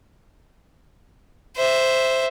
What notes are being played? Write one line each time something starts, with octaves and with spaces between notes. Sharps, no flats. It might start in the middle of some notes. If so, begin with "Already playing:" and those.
C5 E5